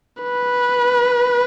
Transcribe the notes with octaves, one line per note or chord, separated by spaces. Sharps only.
B4